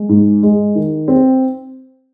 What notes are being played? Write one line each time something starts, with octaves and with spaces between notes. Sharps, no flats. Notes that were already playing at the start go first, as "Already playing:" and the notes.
Already playing: G#3
G#2
G#3
D#3
C4